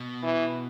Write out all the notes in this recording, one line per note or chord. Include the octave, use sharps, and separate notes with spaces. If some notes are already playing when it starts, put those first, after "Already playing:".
Already playing: B2
E3